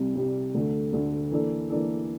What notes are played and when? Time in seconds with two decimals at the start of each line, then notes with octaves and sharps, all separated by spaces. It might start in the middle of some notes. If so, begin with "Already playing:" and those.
Already playing: C2 C3 G3
0.15 C2 C3 G3
0.54 D2 D3 A3
0.92 D2 D3 A3
1.31 E3 A#3 D4 A4
1.70 E3 A#3 D4 A4